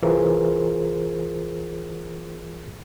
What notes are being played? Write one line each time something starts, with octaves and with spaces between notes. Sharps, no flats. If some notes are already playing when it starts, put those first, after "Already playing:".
C2 E3 F4 G#4 A#4 C5